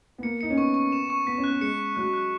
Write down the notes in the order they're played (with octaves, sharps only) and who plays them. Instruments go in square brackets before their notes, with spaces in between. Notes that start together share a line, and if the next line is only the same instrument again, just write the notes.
[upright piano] B3
[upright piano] A#3 [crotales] C#7
[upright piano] D#4 [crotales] C#7
[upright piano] C#4
[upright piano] B3 [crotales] C#6
[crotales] C#6
E7
C#6
[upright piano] B3 [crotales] B6
[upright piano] C#4
[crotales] F#6
[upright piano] B3
[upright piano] G#3 [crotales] C#7
[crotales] C#7
[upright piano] F#3 [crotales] F#6
[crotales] F#6